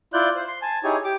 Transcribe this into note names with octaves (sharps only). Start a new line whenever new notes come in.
E4 F4 D5 F#6 G6
C5
C6
G#5 A5
D#4 E4 G4 G#4 C#5 G#5
G4 D6